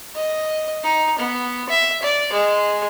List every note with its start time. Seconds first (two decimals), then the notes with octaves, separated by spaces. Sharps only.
0.15 D#5
0.84 D#4
1.19 B3
1.69 E5
2.03 D5
2.33 G#3